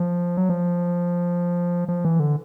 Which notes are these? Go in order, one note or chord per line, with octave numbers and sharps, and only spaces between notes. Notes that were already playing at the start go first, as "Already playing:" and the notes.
Already playing: F3
F#3
F3
F3
E3
D3